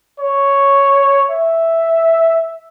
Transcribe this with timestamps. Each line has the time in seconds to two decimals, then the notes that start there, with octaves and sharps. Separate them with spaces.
0.19 C#5
1.31 E5